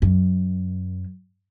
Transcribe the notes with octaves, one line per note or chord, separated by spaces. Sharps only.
F#2